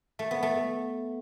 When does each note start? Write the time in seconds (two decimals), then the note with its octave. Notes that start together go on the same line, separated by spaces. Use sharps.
0.19 A3
0.31 B3
0.43 A3